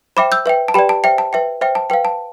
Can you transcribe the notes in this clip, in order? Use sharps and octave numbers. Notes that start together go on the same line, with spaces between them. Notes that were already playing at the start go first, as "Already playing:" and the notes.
C5 E5 G5 B5 D6
E6 G6
B4 E5 G5
A5
G4 B4 D5 G5 B5
A5
C5 E5 G5
A5
B4 E5 G5
C5 E5 G5
A5
B4 F5 G5
A5